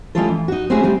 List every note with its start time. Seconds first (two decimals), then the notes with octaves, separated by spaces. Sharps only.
0.15 G3 G#3 C#4 E4 F4 A4
0.29 E3
0.48 D#4 F#4
0.70 A3 C4 C#4 E4 F#4 G#4
0.83 G3 C4 D#4